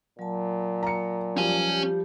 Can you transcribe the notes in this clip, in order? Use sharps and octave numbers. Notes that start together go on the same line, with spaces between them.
A#2 F#3 A5
A#5 C#7
F3 G3 C#4 G#5
G4